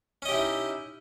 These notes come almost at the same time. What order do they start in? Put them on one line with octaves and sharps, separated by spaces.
C#4 D#5 G4 E4 D#4